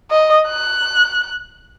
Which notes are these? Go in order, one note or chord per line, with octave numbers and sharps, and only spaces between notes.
D#5
F#6